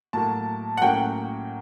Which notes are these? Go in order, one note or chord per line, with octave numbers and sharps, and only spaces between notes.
A2 F#3 A#3 A5
F#5
A2 F#3 A#3 C#4 G5